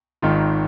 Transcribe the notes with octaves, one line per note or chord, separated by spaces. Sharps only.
G#1 G#2 D#3 F4